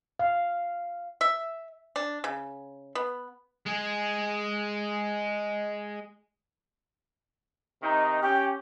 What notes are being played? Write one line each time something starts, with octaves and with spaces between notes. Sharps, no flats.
F5
E5
D4
C#3
B3
G#3 G#4
C3 D#3 D#4
C#4 G4 G5